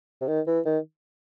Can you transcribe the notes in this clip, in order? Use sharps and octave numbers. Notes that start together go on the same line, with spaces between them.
C3
D#3
E3
D#3